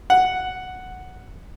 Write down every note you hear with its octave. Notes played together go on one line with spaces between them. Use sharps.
F#5